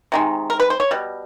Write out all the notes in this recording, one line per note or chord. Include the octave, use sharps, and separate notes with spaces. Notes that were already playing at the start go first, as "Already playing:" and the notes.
C3 D#3 G#3
A#4
B4
C5
C#5
B2 G3